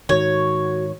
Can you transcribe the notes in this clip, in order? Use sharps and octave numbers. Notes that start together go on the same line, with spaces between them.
G#2 D#3 F#4 C#5